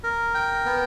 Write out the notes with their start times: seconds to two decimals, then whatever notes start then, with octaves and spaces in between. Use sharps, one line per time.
0.04 A#4
0.34 G5
0.65 B3